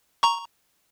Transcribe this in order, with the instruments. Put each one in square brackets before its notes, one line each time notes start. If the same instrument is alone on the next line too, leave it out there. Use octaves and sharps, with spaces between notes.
[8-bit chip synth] A#5 C#6